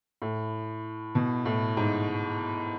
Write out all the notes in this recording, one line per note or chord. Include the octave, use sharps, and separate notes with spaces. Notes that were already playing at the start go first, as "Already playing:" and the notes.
A2
B2
A2
G#2